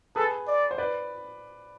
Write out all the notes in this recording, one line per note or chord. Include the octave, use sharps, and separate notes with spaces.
G#4 A4 B4
D5
C5
B4 D5